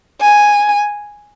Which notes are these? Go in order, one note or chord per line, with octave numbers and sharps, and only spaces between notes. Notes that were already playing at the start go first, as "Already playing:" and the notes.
G#5